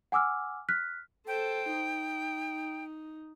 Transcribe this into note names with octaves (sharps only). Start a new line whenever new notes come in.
F#5 G#5 D6 E6 F6
F6 F#6 B6
A4 C5 G5
D#4